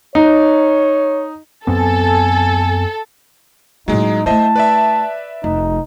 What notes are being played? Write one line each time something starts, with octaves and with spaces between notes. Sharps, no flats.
D#4 C#5
F#2 B3 C4 A4 G#5
A2 F#3 G#3 A#3 D#4
A3 E4 C5 D#5 E5 A5
B4 D5 E5
F1 D#4